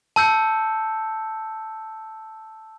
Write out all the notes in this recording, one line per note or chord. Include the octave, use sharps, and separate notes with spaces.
A5 E6 G6 C#7